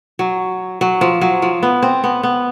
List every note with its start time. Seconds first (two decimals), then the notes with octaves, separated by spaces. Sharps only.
0.19 F#3
0.81 F#3
1.01 F3
1.21 F#3
1.42 F3
1.63 B3
1.82 C4
2.04 B3
2.23 B3